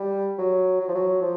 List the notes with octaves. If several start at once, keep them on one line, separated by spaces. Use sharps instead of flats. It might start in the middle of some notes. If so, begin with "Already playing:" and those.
Already playing: G3
F#3
F#3
F3
F#3
F3